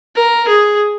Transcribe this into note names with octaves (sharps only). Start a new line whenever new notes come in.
A#4
G#4